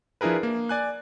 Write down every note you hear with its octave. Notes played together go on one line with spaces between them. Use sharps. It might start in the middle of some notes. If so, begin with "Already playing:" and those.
F3 D4 E4 G#4 A#4 B4
A#3
D5 G#5 F#6